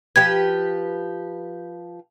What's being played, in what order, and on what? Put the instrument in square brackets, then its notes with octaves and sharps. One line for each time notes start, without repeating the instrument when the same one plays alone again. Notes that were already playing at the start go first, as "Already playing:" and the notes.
[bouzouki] F3 G4 B4 [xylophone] G#6